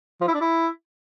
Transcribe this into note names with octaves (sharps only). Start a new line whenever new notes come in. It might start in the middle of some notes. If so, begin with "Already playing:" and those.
F3
E4
D4
E4